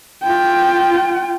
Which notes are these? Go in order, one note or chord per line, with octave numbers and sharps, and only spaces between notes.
F4 G5